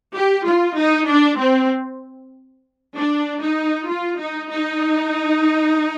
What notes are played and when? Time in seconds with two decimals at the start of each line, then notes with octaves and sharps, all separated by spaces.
0.14 G4
0.45 F4
0.77 D#4
1.08 D4
1.38 C4
2.95 D4
3.41 D#4
3.88 F4
4.19 D#4
4.50 D#4